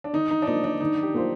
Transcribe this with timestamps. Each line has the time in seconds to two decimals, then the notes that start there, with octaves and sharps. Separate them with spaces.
0.04 D4
0.13 D#3 D#4
0.31 D#4
0.42 D4
0.47 A#3 D#4 F4 C5
0.64 D4
0.81 D#3 D#4
1.03 G4
1.14 A#3 F4 G4 C5